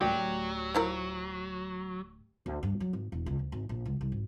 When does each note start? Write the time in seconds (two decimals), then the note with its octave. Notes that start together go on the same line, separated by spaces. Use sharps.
0.01 D1 D2 F#3 G4 D5 G5
0.75 F3 E4 A#4
2.46 D2
2.63 G2
2.80 F#3
2.93 G#1
3.12 E1
3.26 C#2
3.39 D2
3.52 G#1
3.69 A#1
3.85 C#2
4.01 C2
4.12 G#1